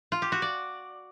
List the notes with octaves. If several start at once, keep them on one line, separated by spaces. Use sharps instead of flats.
F4
G4
F#4
D5